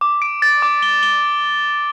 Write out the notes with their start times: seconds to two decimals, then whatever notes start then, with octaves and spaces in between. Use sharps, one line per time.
0.01 D6
0.22 D7
0.42 A6
0.62 D6
0.82 G7
1.03 G7